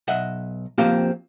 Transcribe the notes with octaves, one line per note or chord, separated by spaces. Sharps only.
B1 D#5 E5 F#5
F3 A#3 C4 F4 G4